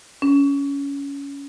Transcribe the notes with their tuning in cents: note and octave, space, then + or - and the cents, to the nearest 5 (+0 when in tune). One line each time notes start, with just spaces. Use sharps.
C#4 +20